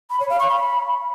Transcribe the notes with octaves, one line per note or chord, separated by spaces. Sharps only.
B5
C#5
F5
C#6
B5